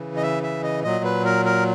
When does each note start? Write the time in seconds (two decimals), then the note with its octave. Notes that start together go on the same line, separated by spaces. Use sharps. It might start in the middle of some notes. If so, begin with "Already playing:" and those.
Already playing: C#3 E3
0.16 D#5
0.23 E5
0.43 E5
0.63 D#5
0.84 A#2 F#3 D#5
1.04 B4
1.25 A#4
1.46 A#4